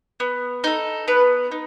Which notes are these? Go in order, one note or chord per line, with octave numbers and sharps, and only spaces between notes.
B3
D#4 A4
B3 B4
D#4